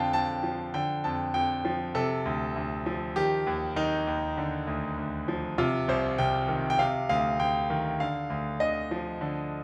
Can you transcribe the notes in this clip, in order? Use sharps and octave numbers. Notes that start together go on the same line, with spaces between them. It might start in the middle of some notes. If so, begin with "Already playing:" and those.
Already playing: F2 D3 F5 G5 A5
F2 A5
F3
D3 G5
F2 A5
F2 G5
F3
C3 A4
D2
D2
F3
D#3 G4
D#2
D#3 D#4
D#2
D3
D2
D2
F3
C3 F4
C2 C5
C2 G5
D#3
G5
C3 F5
D2 F5
D2 G5
D#3
D3 F5
D2
D2 D#5
F3
D3